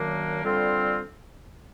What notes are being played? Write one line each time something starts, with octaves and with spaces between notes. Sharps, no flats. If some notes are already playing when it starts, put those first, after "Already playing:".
Already playing: F#2 D#3 F#3 A#3 D4
D3 G3 C4 F4